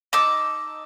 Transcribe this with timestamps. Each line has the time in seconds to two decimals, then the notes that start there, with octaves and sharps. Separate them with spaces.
0.13 D#4 A5 D6 E6